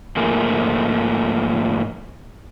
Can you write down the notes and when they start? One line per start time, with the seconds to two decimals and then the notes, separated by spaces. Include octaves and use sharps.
0.17 G#2 F3 A3 A#3 G#4